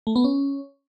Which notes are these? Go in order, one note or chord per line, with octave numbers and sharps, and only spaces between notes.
A3
B3
C#4